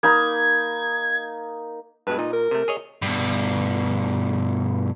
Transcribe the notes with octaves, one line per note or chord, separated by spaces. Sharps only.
A#3 D#4 B5 G#6
G2 B2 G#3 B4
A#2 D#4
A#4
C3 A3
G#4 C#5 D#5
G2 B2